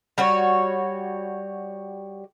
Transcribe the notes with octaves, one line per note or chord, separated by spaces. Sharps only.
G3 F#4 C#5